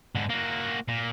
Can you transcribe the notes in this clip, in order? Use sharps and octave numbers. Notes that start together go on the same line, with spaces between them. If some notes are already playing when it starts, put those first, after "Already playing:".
G#2 D3
A#3 F#4
A#2